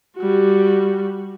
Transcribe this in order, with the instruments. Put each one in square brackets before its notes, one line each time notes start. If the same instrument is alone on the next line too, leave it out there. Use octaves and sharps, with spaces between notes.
[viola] G3 F#4